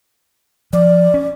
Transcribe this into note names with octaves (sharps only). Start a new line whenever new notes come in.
F3 D5
C#4